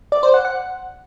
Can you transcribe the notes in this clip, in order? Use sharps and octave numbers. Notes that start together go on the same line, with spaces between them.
D5
C5
F#5
F#5